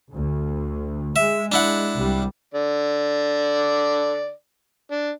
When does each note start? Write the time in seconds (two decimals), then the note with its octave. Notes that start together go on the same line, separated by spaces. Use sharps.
0.13 D2
1.16 G#3 E5
1.52 D4 E4 F#5
1.96 C2 G3
2.54 D3 D5
4.91 D4